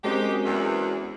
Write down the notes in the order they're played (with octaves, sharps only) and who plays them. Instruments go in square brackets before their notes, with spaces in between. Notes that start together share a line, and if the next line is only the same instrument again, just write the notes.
[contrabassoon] F#2 [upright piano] G#3 C4 [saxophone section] D#4 G4
[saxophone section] E2